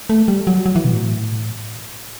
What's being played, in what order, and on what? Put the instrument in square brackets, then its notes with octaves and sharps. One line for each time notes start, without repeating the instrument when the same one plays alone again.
[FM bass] A3
G3
F#3
F#3
E3
B2
A2